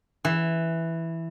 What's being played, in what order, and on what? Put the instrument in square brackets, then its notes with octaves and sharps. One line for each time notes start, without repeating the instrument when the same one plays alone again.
[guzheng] E3